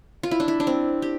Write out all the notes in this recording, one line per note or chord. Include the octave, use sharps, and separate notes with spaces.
F4
E4
D4
E4
D4
C4
G4